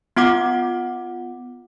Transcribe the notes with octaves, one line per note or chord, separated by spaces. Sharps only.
B3 F4 F#5 D6